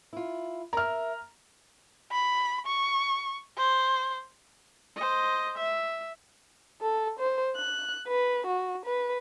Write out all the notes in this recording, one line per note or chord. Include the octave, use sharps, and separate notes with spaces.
E4 F4
A#4 E5 A#5 F6
B5
C#6
C5
C5 D#5
E5
A4
C5
F#6
B4
F#4
B4